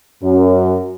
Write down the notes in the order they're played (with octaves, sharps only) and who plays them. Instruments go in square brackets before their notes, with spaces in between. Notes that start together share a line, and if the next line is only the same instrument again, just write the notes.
[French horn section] F#2